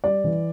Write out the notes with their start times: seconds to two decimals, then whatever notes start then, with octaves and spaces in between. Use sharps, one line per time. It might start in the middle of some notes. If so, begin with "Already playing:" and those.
0.04 G3 D5
0.24 E3